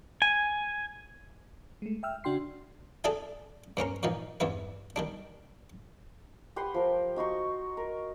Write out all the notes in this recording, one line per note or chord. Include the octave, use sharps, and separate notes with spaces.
G#5
G#3 A3
E5 G5 E6 F6
C#3 D4 F#4 G5 C6 C7
D4 G#4 A4 D5 E5 G#5
G2 C4 C#4 A#4
A#2 E3 F3 D#4
E2 G2 E4 B4
D#3 G3 D4
G4 B4 F#5 C6
F3 A#4
D#4 F#4 C6 C#6
A#4